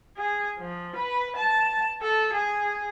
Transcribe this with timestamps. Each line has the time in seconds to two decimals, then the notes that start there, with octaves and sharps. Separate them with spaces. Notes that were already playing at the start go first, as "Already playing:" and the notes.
0.18 G#4
0.59 F3
0.96 B4
1.36 A5
2.02 A4
2.33 G#4